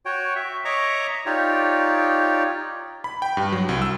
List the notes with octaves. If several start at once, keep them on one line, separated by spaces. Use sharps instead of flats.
F#4 C#5 G5
E5
C#5 D#5 E5 A#5 C#6 D6
D#4 F4 G4 C#5 D5
B5
G5
G2
F#3
C2
E6